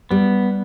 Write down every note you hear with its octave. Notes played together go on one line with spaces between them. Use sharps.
G3 B3